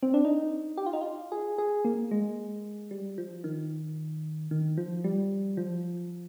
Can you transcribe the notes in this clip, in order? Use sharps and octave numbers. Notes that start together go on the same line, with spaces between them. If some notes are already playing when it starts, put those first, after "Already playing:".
C4
D4
D#4
G4
F4
D#4
F4
G#4
G#4
A#3
G#3
G3
F3
D#3
D#3
F3
G3
F3